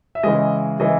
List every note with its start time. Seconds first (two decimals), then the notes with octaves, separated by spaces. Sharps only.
0.15 E5
0.23 C#3 E3 G#3 D#5
0.80 C#3 E3 G#3 D#5